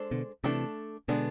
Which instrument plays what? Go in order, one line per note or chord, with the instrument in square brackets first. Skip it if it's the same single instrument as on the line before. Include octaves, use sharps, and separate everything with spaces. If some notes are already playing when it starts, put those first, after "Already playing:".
Already playing: [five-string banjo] G#3 D4 A4 C5
[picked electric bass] B2 D3
[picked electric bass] C3 E3 [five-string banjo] A3 D4 A4
[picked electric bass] B2 D3 [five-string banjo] G#3 B3 D4